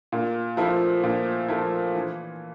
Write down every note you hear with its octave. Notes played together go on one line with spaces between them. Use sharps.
A#2
F3 A3 E4
A#2
F3 A3 E4
E3